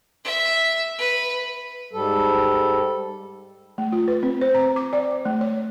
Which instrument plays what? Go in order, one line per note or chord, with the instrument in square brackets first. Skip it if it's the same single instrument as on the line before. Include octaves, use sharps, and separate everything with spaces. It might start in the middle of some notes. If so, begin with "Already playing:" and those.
[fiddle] E5
B4
[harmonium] G#2 G3 A4
[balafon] A3
F4
B4
C4
C5
A#5
D6
D5
A3
C#5